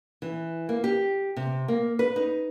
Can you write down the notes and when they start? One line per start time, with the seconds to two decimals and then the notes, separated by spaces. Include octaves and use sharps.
0.22 E3
0.69 A#3
0.84 G4
1.36 C3
1.68 A#3
1.99 B4
2.16 D#4